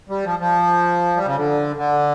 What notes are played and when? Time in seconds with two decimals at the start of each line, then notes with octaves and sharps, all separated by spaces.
0.09 G3
0.24 F3
0.39 F3
1.16 G3
1.25 C#3
1.36 D3
1.76 D3